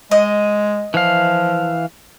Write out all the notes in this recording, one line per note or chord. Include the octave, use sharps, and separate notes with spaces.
G#3 D#5
E3 F3 F5